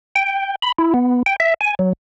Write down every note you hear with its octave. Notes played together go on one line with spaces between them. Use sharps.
G5
B5
E4
B3
G5
E5
G#5
F#3